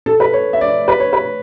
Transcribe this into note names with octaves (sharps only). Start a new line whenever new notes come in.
A4
B4
C#5
E5
D5
B4
C#5
B4